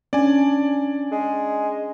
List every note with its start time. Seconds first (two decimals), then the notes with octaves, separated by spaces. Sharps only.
0.13 C#4 D4 D5 G#5
1.12 G#3